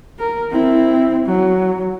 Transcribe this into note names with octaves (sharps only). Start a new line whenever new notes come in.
A#4
C4 E4
F#3